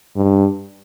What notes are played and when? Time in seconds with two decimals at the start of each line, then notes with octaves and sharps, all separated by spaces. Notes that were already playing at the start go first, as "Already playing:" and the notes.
0.16 G2